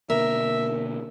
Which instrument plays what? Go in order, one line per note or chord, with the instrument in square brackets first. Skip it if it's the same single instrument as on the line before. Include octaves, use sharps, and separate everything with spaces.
[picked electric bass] B2 D3 A#3 [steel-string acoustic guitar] A#4 [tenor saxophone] E5